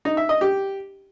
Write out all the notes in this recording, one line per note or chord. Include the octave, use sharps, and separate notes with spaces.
D#4
E5
D#5
G4